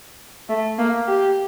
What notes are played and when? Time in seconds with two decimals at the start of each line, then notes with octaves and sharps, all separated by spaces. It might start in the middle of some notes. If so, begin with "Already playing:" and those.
0.49 A3
0.78 A#3
1.08 G4